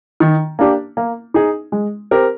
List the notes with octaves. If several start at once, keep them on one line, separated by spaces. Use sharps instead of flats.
D#3
A#3 D4 G4
A#3
D#4 G#4
G#3
C4 G4 A#4